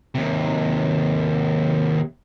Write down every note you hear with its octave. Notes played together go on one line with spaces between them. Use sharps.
D#2 C3